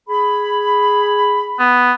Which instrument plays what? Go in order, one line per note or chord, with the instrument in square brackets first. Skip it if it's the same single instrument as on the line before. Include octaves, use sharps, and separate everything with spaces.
[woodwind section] G#4 B5
[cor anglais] B3